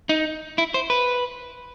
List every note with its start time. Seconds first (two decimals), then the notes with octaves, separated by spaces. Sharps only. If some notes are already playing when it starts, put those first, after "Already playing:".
0.09 D#4
0.58 E4
0.74 C5
0.90 B4